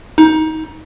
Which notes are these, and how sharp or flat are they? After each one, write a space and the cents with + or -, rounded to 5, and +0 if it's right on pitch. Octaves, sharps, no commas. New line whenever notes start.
D#4 +20